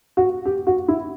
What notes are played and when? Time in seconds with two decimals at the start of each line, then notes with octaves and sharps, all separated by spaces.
0.17 F#4
0.45 G4
0.67 F#4
0.88 E4